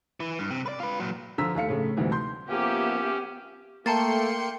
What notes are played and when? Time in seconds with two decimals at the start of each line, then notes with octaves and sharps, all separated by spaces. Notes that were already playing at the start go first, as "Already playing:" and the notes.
0.20 E3
0.39 G2
0.50 C3
0.66 B4 D5
0.80 F4 B4
1.00 A#2 F#3
1.38 D3 F3 F4 A#5 E6 B6
1.55 D#2 A3 F5 C#7
1.69 A2 C#3 A3
1.97 D2 G#2 C3 E3 G3
2.12 C6 G6
2.49 F3 A#3 B3 C#4 G4 E5
3.86 A3 A#3 G5 A5 A#5 C6 A6 C#7